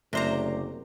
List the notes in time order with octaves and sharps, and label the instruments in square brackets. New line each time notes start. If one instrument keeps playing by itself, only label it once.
[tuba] F#1 [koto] C3 C5 A#5 [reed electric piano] A3 D5 D6